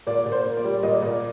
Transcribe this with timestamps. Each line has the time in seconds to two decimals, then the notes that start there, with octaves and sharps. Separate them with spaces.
0.07 A#2 D5
0.26 A#2
0.32 C5
0.45 A#3
0.57 D5
0.64 G3
0.83 A#2 D#5
1.02 A#2